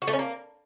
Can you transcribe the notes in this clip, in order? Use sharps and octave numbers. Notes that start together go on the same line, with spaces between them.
F#4
A3
C#4
A#3